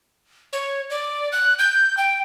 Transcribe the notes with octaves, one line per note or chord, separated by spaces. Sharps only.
C#5
D5
F#6
G6
G5